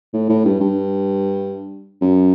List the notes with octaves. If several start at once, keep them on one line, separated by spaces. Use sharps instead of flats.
A2
A2
G2
G2
F#2